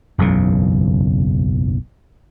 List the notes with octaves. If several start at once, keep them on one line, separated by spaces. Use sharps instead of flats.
F#1 B1 E2 C#3